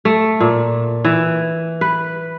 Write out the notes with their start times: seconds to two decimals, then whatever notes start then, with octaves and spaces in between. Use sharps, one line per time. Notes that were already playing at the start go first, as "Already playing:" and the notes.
0.05 A3
0.40 A#2
1.05 E3
1.81 B4